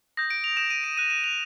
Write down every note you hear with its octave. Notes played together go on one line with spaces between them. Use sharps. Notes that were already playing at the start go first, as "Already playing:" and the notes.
D#6 G6 A#6
D7
F7
D#6 G6 E7
D#7
D7
D#6 F#6 D#7
E7
F7